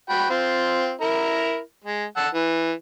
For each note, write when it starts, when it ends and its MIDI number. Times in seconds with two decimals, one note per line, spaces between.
0.10 0.28 66
0.10 0.28 79
0.10 0.28 83
0.30 0.92 60
0.30 0.92 65
1.01 1.58 64
1.01 1.58 70
1.01 1.58 82
1.84 2.05 56
2.17 2.28 78
2.17 2.28 81
2.17 2.28 88
2.34 2.72 52